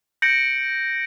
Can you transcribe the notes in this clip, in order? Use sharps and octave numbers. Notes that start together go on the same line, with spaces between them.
G6 A#6 C#7 D7 F#7